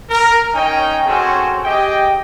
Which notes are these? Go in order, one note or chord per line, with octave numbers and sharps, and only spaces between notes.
A#4
C#4 D#4 G5
C4 C#4 F#4 G#4 A4 C5
G4 G#4 D#5 G5